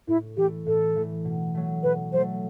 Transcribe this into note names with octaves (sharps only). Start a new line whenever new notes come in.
A2 E4
E3 A3 G4
A2 A4
E3 A3
B2
F#3 A3
B2 B4
F#3 A3 C5